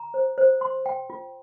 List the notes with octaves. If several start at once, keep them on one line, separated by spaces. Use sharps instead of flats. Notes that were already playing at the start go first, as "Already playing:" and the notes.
Already playing: A#5
C5
C5
C6
G5
F4